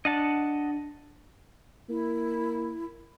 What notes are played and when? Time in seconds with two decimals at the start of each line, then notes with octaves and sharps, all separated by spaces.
0.05 D4 D#5 F#5 A5
1.89 A#3 E4